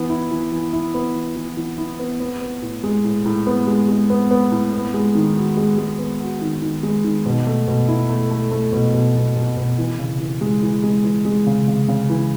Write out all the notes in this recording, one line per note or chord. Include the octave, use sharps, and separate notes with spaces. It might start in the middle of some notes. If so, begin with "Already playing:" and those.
Already playing: E3 B3
E4
E3
E3
E4
B3
E3
E3
E3
E4
B3
B3
B3
A2
G#3
A2
A2
B3
G#3
G#3
B3
B3
A2
B3
G#3
D#3
F#4
G#3
G#3
B3
F#4
D#3
D#3
G#3
D#3
B2
A3
B2
E4
A3
A3
A3
B2
B2
B2
B2
B2
E3
C#3
E3
G#3
E3
G#3
E3
G#3
C#3
C#3
C#3
E3